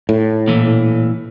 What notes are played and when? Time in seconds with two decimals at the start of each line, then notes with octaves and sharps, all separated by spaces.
0.09 A2
0.47 A#2 E3